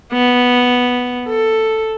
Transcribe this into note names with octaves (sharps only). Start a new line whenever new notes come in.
B3
A4